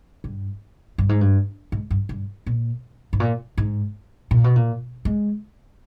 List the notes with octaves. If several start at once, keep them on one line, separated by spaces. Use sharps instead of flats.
G2
G2
G#2
G2
G#2
G2
G2
A#2
G#2
A#2
G#2
A#2
B2
A#2
G#3